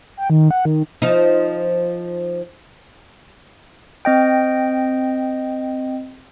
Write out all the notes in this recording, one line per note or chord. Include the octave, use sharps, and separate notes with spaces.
G5
D#3
F#5
D#3
F3 D#4
C4 D#5 G5